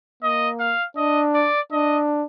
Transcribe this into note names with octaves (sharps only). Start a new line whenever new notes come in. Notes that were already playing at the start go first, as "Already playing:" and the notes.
A#3 D#5
F5
D4 D#5
D5
D4 D#5